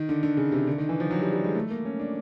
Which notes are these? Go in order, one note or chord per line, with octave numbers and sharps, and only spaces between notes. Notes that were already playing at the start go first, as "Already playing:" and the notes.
Already playing: D#3
D3
D3
C#3
C3
D3
D#3
E3
F3
F#3
G3
G3
G#3
A3
A#3
C#4
D4